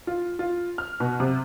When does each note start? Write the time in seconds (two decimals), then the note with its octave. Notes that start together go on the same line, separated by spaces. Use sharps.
0.07 F4
0.39 F4
0.78 F6
1.00 B2
1.20 C3